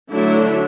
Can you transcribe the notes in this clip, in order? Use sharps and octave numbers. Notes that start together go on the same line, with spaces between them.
D3 F#3 A3 D4 E4